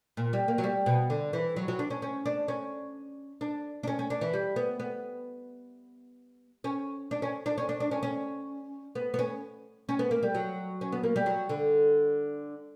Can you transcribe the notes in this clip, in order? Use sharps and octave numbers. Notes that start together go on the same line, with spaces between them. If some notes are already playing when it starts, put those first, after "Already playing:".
A#2
G3
A#3
F#3
G3
B2
D3
E3
F#3
F#3
D4
C#4
C#4
D4
C#4
D4
D4
C#4
C#4
D4
E3
G3
B3
B3
C#4
D4
C#4
D4
C#4
D4
D4
C#4
C#4
B3
B3
C#4
C#4
B3
A#3
G3
F#3
C#4
B3
A#3
G3
F#3
D3